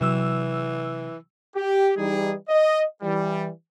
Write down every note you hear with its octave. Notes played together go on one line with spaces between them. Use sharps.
C3 E3 F#3 E6
G4
E3 G3 D#4 G#4
D#5
E3 G3